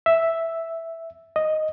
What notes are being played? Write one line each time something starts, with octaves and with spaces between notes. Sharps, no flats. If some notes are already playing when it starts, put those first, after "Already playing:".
E5
D#5